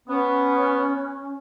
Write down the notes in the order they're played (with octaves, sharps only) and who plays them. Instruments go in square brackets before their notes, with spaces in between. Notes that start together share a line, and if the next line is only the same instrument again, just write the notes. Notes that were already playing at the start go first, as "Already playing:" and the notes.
[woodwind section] B3 [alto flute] C#4